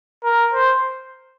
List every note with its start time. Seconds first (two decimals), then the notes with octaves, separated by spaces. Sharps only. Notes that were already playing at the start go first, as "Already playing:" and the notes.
0.24 A#4
0.54 C5